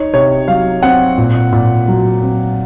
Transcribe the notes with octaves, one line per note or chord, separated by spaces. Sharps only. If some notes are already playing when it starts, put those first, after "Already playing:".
Already playing: D#4 C#5
C3 C#5
F#3 F5
C4 F#5
A#2
A#2
F#3
C4